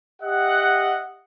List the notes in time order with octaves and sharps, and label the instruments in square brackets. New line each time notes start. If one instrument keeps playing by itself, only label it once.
[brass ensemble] G4 D#5 E5 F#5